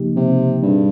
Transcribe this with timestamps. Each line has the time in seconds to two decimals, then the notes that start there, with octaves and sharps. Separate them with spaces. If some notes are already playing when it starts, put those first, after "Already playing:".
Already playing: C#3 F3 A#3 D#4 G4
0.16 C3
0.62 G2 B2 G3 C4 D#4 G#4